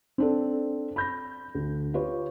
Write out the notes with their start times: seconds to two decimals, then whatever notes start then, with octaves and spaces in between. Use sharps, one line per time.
0.18 C4 D4 A4
0.96 B5 G6 A#6
1.55 D2
1.94 F4 G4 B4 C#5